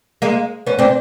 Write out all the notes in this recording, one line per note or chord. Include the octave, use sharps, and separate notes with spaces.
G#3 A#3
B3 C#4
C4 D4